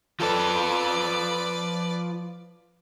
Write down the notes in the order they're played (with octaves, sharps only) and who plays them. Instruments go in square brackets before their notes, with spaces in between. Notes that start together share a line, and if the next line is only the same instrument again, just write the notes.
[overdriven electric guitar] F3 A4 [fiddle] B4 D5